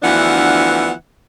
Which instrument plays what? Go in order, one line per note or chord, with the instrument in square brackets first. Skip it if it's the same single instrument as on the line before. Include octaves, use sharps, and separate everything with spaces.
[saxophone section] D2 E3 F3 B3 D4 F#5